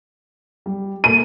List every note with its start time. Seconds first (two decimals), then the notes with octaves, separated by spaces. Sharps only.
0.66 G3
1.04 A3 A#3 D#7